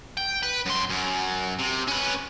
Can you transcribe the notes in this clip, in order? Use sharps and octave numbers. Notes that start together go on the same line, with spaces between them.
G5
B4
F#2 C6
F#2
C3
C#4 B4